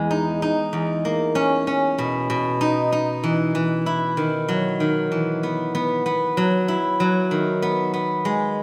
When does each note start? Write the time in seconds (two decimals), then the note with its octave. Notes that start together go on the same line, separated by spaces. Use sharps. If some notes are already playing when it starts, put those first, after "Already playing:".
Already playing: E2 G#3
0.11 D#4
0.42 D#4
0.73 E2
1.05 A#3
1.35 C#4
1.67 C#4
1.98 B2
2.30 B2
2.61 D#4
2.92 D#4
3.24 E3
3.55 E3
3.86 E4
4.17 D#3
4.49 F#3
4.80 D#3
5.12 E3
5.43 B3
5.75 B3
6.06 B3
6.37 F#3
6.68 E4
7.00 F#3
7.31 D#3
7.62 B3
7.94 B3
8.25 G#3